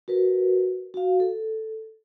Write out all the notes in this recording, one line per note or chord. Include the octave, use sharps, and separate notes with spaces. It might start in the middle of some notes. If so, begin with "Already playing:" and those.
F#4 A#4 B4
F#4 F5
A4